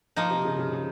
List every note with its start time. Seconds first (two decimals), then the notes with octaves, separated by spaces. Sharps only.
0.16 F3 A#3 D#4
0.30 C3
0.45 C#3
0.59 C#3
0.73 C#3